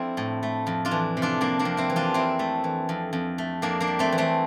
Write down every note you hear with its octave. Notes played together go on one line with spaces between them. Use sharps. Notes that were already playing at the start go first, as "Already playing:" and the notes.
Already playing: F3 A3 C4 D4 E4
A2
A3
F2
D4 F4
E3
C3
D4 F4
F2 A#3 D4
A#3 D4
F2
C4 E4
E3
D4 F4
F2 C4 E4
A3
E3
F2
F2
A3
F2 A#3 D4
A#3 D4
G3
A3 C4
E3
A3 C4